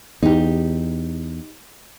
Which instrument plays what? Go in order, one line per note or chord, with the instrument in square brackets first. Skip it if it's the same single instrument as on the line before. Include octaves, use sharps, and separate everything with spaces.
[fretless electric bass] E2 [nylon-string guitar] D#4 G4